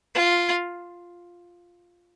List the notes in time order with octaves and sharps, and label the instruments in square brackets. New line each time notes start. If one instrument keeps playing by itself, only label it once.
[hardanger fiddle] F4